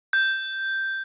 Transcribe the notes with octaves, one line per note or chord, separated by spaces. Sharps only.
G6